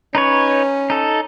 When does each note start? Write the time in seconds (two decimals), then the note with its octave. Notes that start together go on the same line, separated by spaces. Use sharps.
0.15 C#4 D#4 B4 C#5
0.90 D#4 A4